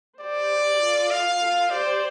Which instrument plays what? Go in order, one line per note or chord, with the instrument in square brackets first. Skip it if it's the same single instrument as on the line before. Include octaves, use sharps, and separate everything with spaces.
[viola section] G4 C5 [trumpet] D5
[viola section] F4 A4
[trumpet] F5
[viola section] F4 A4
[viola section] G4 C5 [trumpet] D5